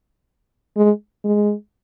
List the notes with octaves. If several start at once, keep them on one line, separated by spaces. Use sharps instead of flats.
G#3
G#3